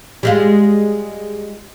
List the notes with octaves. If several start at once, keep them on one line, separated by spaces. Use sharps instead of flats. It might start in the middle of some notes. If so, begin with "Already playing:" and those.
G3 G#3 F4